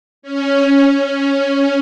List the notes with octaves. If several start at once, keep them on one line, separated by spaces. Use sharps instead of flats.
C#4
C#4